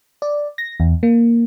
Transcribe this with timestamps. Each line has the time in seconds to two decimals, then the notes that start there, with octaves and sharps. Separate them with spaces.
0.22 D5
0.58 A#6
0.80 E2
1.03 A#3